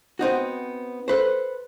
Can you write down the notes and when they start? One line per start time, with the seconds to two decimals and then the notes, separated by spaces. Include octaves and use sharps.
0.19 B3 C4 D#4 F#4
1.08 A4 B4 C5